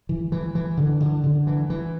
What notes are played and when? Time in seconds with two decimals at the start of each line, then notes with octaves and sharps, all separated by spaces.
0.09 E3
0.32 E3
0.55 E3
0.77 D3
1.00 D3
1.24 D3
1.47 E3
1.70 E3